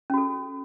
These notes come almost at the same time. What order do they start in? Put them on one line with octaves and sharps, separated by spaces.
C#4 F#4 A4